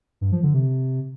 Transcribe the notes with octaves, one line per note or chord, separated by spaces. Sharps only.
G2
F3
D3
C3